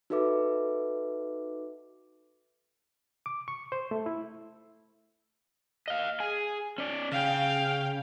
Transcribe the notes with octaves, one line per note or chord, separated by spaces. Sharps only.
D#4 F#4 A4 B4 E5 D6
D6
C#6
C5
A3
E4
D#5 F5
G#4 G#5
C#4 D5
C#3 F5 G5